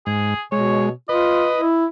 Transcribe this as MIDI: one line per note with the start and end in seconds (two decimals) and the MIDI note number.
0.07 0.34 44
0.07 0.42 68
0.52 0.91 47
0.52 0.89 56
0.52 0.88 73
1.09 1.48 65
1.09 1.61 71
1.09 1.64 75
1.56 1.86 64